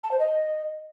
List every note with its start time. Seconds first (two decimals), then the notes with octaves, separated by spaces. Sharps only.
0.03 A5
0.11 C5
0.19 D#5